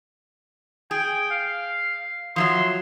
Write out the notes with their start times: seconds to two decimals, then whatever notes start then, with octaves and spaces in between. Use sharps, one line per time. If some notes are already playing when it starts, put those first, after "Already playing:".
0.91 G#4 G5
1.31 F5
2.36 F3 F#3 E5 C6